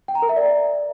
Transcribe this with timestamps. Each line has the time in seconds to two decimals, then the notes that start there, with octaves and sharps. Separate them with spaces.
0.08 G5
0.15 A#5
0.22 A#4
0.29 E5
0.36 D5